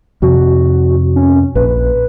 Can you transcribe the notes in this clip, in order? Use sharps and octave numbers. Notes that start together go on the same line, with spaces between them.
F2 C3 F#4
C#4
A#1 B4